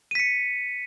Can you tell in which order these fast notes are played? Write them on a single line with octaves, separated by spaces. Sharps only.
D#7 B6 C#7